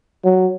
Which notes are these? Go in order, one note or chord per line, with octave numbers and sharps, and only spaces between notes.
F#3